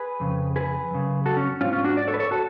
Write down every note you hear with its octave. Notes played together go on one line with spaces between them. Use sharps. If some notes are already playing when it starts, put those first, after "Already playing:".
Already playing: G#4 B4
F2 C#3
G#4 B4
F#2 C#3
F#4 A4
C#4
G#2 C#4 F4
C#4 F4
D4 F#4
D5
A4 C#5
B4
A4 C#5
F#4 A4